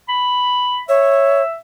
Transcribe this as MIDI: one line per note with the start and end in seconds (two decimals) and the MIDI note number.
0.09 0.80 83
0.89 1.42 73
0.89 1.59 76